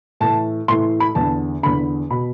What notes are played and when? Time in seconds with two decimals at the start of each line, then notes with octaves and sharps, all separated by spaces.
0.20 A2 E3 A5
0.68 A2 E3 C6
1.00 B5
1.15 E2 D3 A5
1.63 E2 D3 B5
2.10 B2 B5